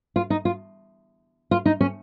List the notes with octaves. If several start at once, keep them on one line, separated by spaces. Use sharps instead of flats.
F4
D#4
F4
F4
D#4
C#4